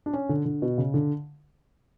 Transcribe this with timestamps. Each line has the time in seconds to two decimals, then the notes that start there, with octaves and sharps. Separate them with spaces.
0.06 D4
0.13 C#4
0.29 D3
0.45 D3
0.62 B2
0.78 C#3
0.94 D3